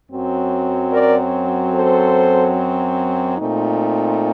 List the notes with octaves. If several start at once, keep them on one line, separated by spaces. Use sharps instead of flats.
F#2 F#3 C4
A#4 D5
A4 C5
A#2 A3 C4 D#4